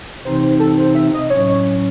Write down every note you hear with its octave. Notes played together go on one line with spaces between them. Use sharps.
C3 E3 C4 D#4 C5
C5
A4
C5
E5
D#5
A2 F#3 C#4 C#5